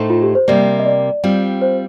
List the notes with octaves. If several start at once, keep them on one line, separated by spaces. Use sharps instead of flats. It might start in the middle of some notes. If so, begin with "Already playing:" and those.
Already playing: A2 A3 D#4 A4 C5
F4
G4
C5
C3 G3 A#3 D5
D#5
D5
G3 C4 F4
C5